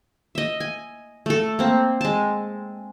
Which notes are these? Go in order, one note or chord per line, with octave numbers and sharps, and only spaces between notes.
D#5 E5
G#5
A3 A4
A#3 C4
G#3 A5